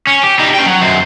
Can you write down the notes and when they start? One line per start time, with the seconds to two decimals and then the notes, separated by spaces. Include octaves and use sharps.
0.07 C#4
0.24 G4
0.39 G3 D#4
0.54 C#4 G5
0.66 F#3
0.81 F#2 C5